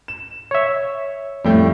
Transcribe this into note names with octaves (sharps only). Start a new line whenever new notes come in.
E7
C#5 E5
F2 A2 G3 A3 G5